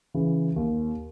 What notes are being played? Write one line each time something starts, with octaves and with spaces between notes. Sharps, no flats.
C#3 E3
D#2